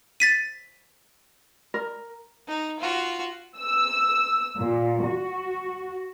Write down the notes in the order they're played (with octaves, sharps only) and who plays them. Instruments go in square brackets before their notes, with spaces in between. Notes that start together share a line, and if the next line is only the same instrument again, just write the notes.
[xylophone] A6 B6 D#7
[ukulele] A#4
[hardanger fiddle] D#4
F4 F#4
[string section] E6
A#2
F#4